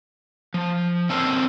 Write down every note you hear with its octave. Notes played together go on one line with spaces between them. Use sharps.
F3
D3 C4 C#4 A4 A#4 C5